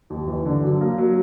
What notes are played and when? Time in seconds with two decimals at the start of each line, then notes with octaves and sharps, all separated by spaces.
0.10 D#2
0.28 E3
0.45 D3
0.63 F#3
0.81 A#3
0.98 F#3